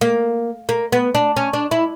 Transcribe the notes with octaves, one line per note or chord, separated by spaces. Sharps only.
A#3
A#3
B3
D4
C#4
D4
E4